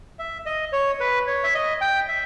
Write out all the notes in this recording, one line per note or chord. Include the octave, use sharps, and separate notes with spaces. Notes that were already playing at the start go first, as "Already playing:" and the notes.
E5
D#5
C#5
B4
C#5
E5
D#5
G5
E5